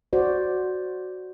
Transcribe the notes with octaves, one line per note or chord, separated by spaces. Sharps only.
F#4 C5 D5